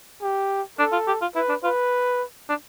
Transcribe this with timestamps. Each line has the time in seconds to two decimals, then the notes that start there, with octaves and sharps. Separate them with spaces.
0.22 G4
0.79 D4 A4
0.92 F4
1.07 G4
1.21 F4
1.35 E4 B4
1.49 D4
1.64 F4 B4
2.49 D4